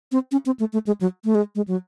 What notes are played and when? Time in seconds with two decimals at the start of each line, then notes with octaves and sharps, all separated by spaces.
0.12 C4
0.32 C#4
0.46 C4
0.60 A3
0.73 A3
0.87 G#3
1.01 F#3
1.25 A3
1.35 G#3
1.55 G#3
1.68 F#3